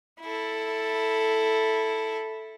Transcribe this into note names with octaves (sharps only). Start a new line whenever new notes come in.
E4 A4